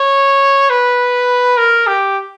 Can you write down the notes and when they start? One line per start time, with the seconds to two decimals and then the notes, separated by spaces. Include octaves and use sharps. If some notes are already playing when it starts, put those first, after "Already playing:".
Already playing: C#5
0.70 B4
1.57 A#4
1.87 G4